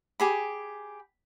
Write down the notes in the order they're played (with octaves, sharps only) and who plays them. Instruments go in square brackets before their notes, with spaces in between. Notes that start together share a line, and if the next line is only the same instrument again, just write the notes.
[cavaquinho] G4 G#4 B5